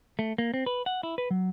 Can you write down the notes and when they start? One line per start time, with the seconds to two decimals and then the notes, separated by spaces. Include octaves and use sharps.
0.19 A3
0.38 A#3
0.54 C4
0.66 B4
0.86 F#5
1.03 E4
1.18 B4
1.31 F#3